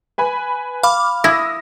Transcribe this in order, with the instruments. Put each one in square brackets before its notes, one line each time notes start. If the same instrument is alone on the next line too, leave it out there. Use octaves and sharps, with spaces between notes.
[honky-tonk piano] B4 G#5 B5
[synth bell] F5 B5 D6 [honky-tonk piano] F6
[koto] E4 [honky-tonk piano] D#6 E6 A#6